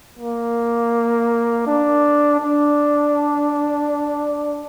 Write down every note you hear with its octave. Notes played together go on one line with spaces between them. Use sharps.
A#3
D4
D4